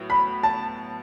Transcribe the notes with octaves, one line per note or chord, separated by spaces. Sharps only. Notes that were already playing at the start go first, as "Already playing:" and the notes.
Already playing: A2 F#3 B3 F#4
B5
A5